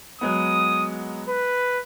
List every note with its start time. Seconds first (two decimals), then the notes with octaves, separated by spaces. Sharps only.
0.21 F#3 G#3 B3 D#6
1.29 B4